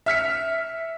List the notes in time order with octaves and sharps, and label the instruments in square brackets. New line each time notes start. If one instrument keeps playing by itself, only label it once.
[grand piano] E5 F6 B6 C#7